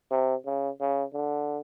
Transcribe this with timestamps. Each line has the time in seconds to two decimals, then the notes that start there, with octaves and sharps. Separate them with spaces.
0.11 C3
0.46 C#3
0.80 C#3
1.13 D3